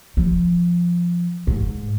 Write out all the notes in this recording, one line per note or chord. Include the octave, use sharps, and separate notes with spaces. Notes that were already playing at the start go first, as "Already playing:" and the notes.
F3
G#2